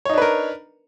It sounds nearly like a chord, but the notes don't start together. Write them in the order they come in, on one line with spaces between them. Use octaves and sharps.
C#5 D#4 D4 B4 A#4